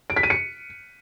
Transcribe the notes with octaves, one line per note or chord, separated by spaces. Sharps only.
D7
B6
D#7
C#7